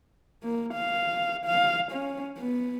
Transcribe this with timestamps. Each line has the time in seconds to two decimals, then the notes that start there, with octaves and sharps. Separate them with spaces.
0.44 A#3
0.74 F5
1.46 F5
1.92 C#4
2.38 B3